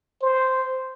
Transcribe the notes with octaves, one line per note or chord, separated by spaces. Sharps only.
C5